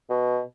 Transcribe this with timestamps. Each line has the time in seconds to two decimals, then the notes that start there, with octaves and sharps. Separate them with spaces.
0.09 B2